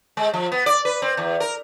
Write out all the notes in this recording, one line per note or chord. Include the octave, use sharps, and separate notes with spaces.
G#3
F3
B3
D5
B4
C4
E2
A#4